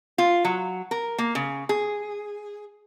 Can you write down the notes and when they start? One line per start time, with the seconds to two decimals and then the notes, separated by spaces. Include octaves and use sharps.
0.18 F4
0.44 F#3
0.91 A#4
1.18 A#3
1.35 C#3
1.69 G#4